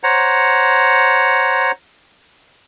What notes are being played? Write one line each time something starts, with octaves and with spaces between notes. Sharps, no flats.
C5 C#5 F#5 A#5